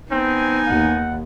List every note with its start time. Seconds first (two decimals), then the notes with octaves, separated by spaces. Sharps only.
0.11 B3 C4 D#4 G#5
0.67 D#2 F#5